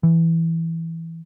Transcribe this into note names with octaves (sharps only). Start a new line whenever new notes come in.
E3